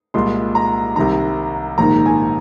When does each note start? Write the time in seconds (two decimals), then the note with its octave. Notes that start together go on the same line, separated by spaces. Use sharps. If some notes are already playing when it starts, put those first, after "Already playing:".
0.14 C2 A#2 G#3 C6
0.55 A#5
0.96 C2 C3 D#3 A#5
1.78 A#1 G#2 D#3 A#5
2.06 G#5